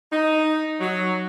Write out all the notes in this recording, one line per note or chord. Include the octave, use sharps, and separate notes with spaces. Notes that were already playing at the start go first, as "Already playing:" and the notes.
D#4
F#3